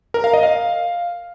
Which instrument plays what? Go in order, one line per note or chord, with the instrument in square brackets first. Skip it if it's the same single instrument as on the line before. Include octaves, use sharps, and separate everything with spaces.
[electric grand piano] A#4
F5
D#5
F5